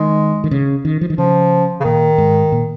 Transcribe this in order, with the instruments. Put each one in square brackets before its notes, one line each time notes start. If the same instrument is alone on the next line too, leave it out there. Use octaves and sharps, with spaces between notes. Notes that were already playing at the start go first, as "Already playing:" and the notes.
Already playing: [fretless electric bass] D#3 [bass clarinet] G#3
[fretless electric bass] D#3
C#3
D#3
F3
D#3
[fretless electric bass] C#3 [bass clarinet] F3
[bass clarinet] C#3
[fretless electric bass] A#2 [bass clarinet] D#3
[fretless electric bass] G#2
A#2